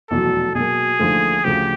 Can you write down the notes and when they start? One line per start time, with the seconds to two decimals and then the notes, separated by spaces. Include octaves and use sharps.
0.10 F1 E2 B2 F#3 A4
0.55 B2 F#3 A#3 G#4
0.99 D#2 D3 F3 A3
1.44 D2 C#3 F3 G4